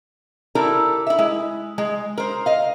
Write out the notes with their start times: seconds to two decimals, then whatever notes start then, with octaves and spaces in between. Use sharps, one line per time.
0.55 E4 G4 A4 A#4 D5
1.07 E4 E5
1.19 G#3 E4
1.78 G#3
2.18 A#4 C5
2.46 D#5 F5